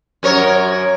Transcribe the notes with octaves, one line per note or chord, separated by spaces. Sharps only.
F#2 A#4 C#5